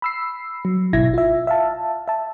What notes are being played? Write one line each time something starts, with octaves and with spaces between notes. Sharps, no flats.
B5 E6 C7
F#3
G#1 B2 E4 E5 G#6 A#6
F4 E5
E5 F5 A5
E5 A5